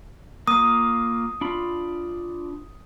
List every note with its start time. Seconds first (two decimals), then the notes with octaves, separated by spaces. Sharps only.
0.47 A#3 F4 D#6
1.41 D4 F4 B5